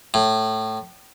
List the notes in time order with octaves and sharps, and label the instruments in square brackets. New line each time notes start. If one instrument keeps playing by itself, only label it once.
[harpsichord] A2